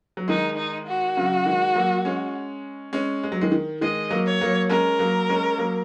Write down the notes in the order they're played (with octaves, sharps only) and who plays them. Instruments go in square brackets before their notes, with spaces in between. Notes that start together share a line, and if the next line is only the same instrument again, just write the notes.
[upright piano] F#3
[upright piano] D#3 G#3 [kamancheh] D#4
[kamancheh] D#4
F#4
[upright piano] C#3 F#3
D#3 G#3
F#3 A#3
G#3 C#4
G#3 C#4
G#3
F#3
D#3 G#3
D#3
[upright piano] D#3 G#3 [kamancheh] D#5
[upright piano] F#3 A#3
[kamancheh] C#5
[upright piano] F#3 A#3
[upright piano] G#3 C#4 [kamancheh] A#4
[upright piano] F#3 A#3
G#3 C#4
F#3 A#3